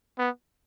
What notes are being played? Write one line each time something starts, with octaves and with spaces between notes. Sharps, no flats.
B3